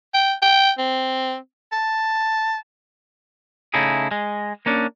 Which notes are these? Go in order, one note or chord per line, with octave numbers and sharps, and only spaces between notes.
G5
G5
C4
A5
C#3 A3 D#4 E4 G#4
G#3
A#3 C#4 D4